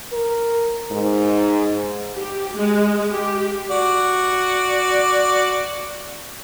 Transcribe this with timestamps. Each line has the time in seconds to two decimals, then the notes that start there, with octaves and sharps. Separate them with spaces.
0.13 A#4
0.91 G#2
2.16 G4
2.55 G#3
3.11 G4
3.70 F#4 D5